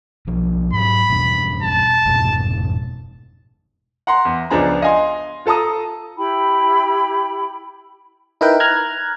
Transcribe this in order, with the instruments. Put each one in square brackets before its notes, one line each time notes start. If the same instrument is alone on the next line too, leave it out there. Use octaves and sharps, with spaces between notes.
[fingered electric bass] B1 F3
[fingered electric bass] G#2 F#3 [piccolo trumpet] B5
[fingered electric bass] E2 G2 B2
[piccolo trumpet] A5
[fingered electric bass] F1 G#2 B2
[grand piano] F#5 A#5 C6
E2
C#2 F3 B3 D4 G#4 A#5
D#5 F5 G#5 C6
F4 A4 A5 A#5 D#6
[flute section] E4 G4 G5 B5
[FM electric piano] D#4 E4 A#4 B4 G5
A#5 F6 F#6 G#6